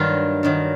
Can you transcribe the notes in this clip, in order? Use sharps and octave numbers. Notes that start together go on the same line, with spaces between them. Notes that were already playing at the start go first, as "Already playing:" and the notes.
Already playing: G2 D#3 F#3 F4
G2 D#3 F#3